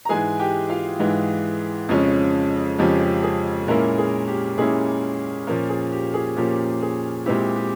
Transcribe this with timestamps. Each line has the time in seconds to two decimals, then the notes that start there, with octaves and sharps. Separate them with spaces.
0.05 A#5
0.09 G#2 E3 G#3 G#4 G#5
0.39 G4 G5
0.69 F4 F5
0.99 G#2 E3 G#3
1.89 F2 C#3 F3 G#3 C#4
2.78 F2 C#3 F3 G#3 C#4 G4
3.03 G4
3.23 G#4
3.68 A#2 G#3 A#3 C#4 E4 A#4
3.98 G#4
4.28 G4
4.58 A#2 G#3 C#4 E4 G#4
5.47 A#2 F3 A#3 C#4 A#4
5.69 G#4
5.92 G4
6.14 G#4
6.36 A#2 F3 A#3 C#4 G4
6.82 G#4
7.26 A#2 G#3 C4 E4 G4
7.56 G4